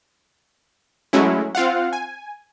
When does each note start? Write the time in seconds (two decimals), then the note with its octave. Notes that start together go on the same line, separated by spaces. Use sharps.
1.13 F#3 G#3 A3 C#4 E4
1.55 C4 F4 F5 F#5
1.93 G#5